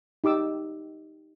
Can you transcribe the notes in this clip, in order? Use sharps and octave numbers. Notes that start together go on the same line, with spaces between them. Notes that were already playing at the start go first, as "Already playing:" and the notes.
D#4 G4 D6 E6